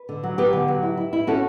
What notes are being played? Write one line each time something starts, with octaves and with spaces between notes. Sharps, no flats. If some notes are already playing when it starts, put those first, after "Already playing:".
Already playing: B4
D3
F#3
B3 G4 B4
D3
F#3
E4
E4
E4
C#4 F#4 A4